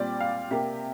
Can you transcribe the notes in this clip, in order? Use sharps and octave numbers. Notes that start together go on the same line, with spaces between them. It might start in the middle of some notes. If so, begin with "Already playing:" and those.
Already playing: A#2 G3 C4 D5
F5
C3 A#3 G4